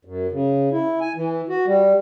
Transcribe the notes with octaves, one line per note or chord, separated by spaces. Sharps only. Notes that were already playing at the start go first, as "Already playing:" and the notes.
F#2
C#3
E4
G#5
E3
F#4
G3